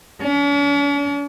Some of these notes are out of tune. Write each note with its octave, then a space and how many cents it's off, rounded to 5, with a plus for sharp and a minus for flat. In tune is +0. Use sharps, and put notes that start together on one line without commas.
C#4 +45